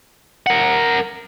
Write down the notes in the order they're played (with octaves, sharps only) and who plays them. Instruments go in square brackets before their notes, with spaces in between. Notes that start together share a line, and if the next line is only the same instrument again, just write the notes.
[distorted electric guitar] A#4 F#5